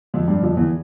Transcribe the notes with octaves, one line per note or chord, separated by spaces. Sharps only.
F2 F3
G2 G3
F2 F3
E2 E3